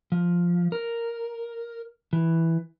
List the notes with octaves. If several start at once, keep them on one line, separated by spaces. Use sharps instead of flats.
F3
A#4
E3